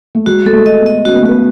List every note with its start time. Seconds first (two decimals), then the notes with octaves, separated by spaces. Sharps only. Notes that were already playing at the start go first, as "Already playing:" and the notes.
0.15 A3
0.26 G#3 F#4
0.46 G#3 A4
0.53 A3
0.66 D#5
0.79 B3
0.86 D#5
1.05 C#4 F#4
1.14 B3
1.21 A3
1.26 B3 F#4